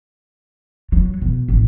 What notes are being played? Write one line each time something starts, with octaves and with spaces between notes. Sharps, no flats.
F#3
B2
A1